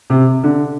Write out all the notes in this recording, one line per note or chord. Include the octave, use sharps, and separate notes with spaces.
C3
D3